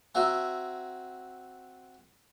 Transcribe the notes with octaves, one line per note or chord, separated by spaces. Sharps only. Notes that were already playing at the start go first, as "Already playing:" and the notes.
C4 F#4 E5 G#5 A#5